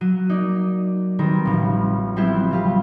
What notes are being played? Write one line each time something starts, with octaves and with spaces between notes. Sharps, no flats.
F#3 D#7
A#3 D#4 D5
D#3 G3 C4 A#4 B4
A1 C#3 F3
F#3 G3 B3 C4 E4 G4
C#3 F4 G4